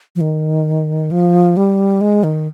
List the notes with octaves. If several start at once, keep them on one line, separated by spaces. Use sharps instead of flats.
F3
D#3
F3
G3
G#3
D#3